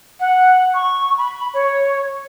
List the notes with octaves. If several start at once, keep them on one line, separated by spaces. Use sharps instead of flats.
F#5
C#6
B5
C#5